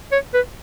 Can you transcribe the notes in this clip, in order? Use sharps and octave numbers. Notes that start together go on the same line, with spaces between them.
C#5
B4